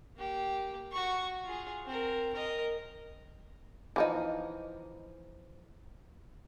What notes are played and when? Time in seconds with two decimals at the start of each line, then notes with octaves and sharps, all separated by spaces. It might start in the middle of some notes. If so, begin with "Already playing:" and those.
0.17 A#3 G4
0.92 F#4 C#6
1.44 F4 G#4
1.86 C4 A#4
2.33 A#4 D#5
3.96 E3 F3 D#4